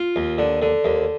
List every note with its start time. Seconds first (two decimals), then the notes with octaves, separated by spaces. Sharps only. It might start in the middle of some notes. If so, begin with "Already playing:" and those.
Already playing: F4
0.16 D#2
0.38 D3
0.62 D3
0.85 D#2